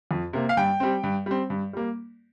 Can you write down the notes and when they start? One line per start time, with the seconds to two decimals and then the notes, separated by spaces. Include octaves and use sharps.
0.11 F2
0.33 C3 A#3
0.49 F5
0.57 G2 G5
0.80 G3 C4
1.03 G2
1.26 G3 C4
1.50 G2
1.73 G3 A#3